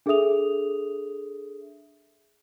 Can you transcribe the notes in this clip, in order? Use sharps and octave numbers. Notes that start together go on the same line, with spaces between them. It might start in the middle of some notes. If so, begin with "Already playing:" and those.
D4 G#4 A4 E5 D#6 F7